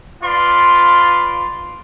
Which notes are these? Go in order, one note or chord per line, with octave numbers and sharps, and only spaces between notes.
F4 B4 D5 F5 C6